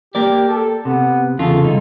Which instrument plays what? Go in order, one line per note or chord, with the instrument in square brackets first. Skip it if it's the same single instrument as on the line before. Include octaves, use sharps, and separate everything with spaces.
[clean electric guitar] A#3 A#4 D5 [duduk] G4
[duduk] A4
[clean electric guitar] C3 [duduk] B3
[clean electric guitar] E2 C#3 F4 [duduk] A4
[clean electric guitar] C2 G2 D#4